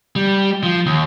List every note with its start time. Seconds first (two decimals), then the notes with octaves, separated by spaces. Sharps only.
0.16 G3
0.63 F3
0.86 D#2